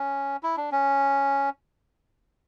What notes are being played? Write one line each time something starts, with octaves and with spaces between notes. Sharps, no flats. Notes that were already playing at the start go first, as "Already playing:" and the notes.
Already playing: C#4
E4
D4
C#4